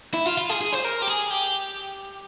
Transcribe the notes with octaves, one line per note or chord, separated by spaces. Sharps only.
E4
F4
F4
G#4
G#4
C5
A#4
G4
G#4
G4